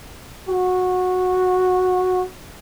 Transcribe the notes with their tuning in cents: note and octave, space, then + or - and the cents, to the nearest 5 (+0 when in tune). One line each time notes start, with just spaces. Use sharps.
F#4 -15